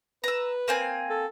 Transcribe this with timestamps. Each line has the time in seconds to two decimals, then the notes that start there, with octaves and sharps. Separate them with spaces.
0.24 B4 A#5 E6
0.68 A#3 C4 G#5
1.10 A4